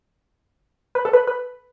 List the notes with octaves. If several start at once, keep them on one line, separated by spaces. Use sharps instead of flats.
B4
A4
B4
B4